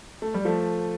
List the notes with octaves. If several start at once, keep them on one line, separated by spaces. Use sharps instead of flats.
A3
G3
F3 A3